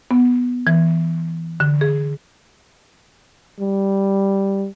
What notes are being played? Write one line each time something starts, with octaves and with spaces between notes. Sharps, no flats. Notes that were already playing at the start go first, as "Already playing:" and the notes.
B3
E3
D3
G#4
G3